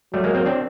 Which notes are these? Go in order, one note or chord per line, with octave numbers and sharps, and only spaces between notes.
F#3 G3 A3
G#3 A#3
A#3 C4
C4 D4